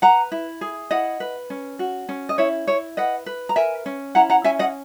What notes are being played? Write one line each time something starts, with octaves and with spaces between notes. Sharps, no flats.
B4 F#5 A#5
E4
G#4
E4 D#5 F#5
B4
C#4
F#4
C#4
D#5
E4 C#5 E5
E4 C#5
B4 D#5 F#5
B4
A#5
A#4 E5 G#5
C#4
E4 F#5 A#5
F#5 A#5
C#4 E5 G#5
D#5 F#5